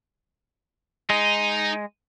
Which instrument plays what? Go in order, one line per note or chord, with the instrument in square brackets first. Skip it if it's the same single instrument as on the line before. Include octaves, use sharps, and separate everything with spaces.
[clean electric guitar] G#3 [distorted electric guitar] D#4